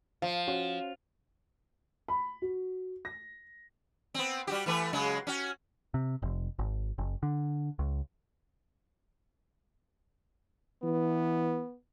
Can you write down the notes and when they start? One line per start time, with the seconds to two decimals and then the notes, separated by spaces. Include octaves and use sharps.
0.22 F3 F5
0.47 C#4 F#4
2.08 B5
2.42 F#4
3.05 A#6
4.14 B3 C4
4.47 G3 F#4 G4
4.66 E3 A3 B4
4.93 C#3 F#3 G#3
5.27 C#4 F#4
5.94 C3
6.22 F1
6.59 G#1
6.98 F#1
7.23 D3
7.79 C#2
10.83 E3 B3